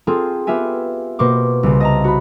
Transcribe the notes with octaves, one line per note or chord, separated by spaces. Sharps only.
C4 F4 G#4 A4
B3 F4 G4 E5 G#5
B2 A#3 C5 C#6 D6
C2 C#3
D#5 A5 A#5
F#4 B5